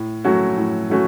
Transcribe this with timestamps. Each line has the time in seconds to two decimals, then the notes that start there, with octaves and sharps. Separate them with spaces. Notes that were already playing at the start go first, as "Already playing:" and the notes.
Already playing: A2
0.24 F#3 A3 C#4 F#4
0.57 A2
0.90 F#3 A3 C#4 F#4